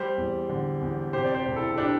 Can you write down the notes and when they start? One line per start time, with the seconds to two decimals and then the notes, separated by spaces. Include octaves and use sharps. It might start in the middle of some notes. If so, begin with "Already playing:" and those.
Already playing: G3 G4 C5
0.18 E2
0.49 D3
0.81 E2
1.13 C3 G4 C5
1.24 D5
1.35 G4 C5
1.45 E1
1.56 E4 A4
1.78 D4 G4